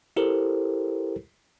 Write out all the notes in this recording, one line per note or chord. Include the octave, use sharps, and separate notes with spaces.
E4 G4 A4 A#4 C5